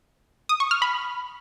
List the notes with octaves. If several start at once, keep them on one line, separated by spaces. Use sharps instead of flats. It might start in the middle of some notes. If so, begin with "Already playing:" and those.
D#6
C#6
F6
B5